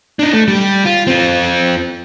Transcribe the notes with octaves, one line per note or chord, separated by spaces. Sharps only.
D4 D#4
A3
G3 G4
F4
C4 F4